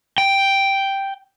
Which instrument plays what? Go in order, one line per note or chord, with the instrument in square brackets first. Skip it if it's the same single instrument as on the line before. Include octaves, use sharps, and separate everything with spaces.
[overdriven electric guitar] G5